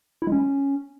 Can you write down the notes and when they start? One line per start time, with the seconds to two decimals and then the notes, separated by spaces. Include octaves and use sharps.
0.22 E4
0.27 G#3
0.32 C#4